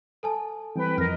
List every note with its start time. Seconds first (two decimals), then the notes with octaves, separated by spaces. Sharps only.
0.23 A4 G#5 A5
0.76 E3 G3 C4 B4 G5
0.98 F2 A#4 D#5 F6